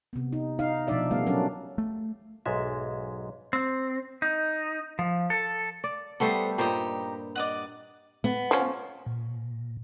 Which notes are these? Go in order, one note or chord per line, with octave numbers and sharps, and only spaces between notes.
C3 B3
D#4
D#4 F5
B2 F3 D4 D#4 D5 E5
C#3 G3 A3 B3 F5
F#3 C#4 D4 A#4 D5
A3
B1 G#2 G#3 E5
C4
D#4
F3
A4
D5
G3 A3 B3 A4 C5 D#6
G2 A#2 D#4 G4 C5 D#6
D5 D#5 F#5
B3
F3 C#4
A#2